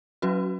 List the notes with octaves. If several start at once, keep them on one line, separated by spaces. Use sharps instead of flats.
F#3 C#4 F#4 B4